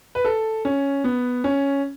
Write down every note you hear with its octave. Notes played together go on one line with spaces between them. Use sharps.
B4
A4
C#4
B3
C#4